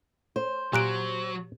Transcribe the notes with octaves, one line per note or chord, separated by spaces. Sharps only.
C5
A#2 F#3 G4 F#6 D7